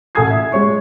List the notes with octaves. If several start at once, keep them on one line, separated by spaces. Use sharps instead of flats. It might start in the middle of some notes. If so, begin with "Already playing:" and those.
A1 A4 G#5 D#6 G#6 C7
E5
G#3 C#5 C#6